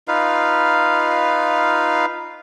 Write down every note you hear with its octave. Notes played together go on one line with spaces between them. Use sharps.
D#4 F4 B4 F5